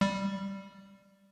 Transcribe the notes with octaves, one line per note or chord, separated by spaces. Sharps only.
G3